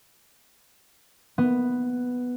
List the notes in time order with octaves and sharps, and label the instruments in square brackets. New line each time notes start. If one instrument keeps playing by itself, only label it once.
[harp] B3